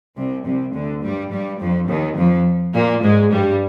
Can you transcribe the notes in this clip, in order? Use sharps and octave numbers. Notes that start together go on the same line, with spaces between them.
C2 C3
C2 C3
D2 D3
G2 G3
G2 G3
F2 F3
D#2 D#3
F2 F3
A#2 A#3
G#2 G#3
G2 G3